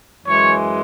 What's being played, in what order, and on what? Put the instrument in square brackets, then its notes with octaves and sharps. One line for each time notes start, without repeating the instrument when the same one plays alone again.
[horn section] F#2 E3 G#3 C#5